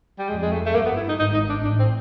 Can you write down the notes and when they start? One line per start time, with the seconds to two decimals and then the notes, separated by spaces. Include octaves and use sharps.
0.19 G3
0.29 F2 G#3
0.42 G#3
0.52 A3
0.66 A3
0.74 G1 G2 A#3
0.86 B3
0.97 E4
1.08 D#4
1.19 G#1 G#2 D#4
1.34 D#4
1.49 D4
1.64 A1 A2 D4
1.79 C4